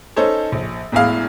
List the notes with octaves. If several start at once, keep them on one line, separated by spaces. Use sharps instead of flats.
C#4 D#4 A4 C5 C#5
A#1
E1 E2 A2 G#4 F5